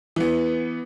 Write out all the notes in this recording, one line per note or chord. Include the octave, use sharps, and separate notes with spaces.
E3 B3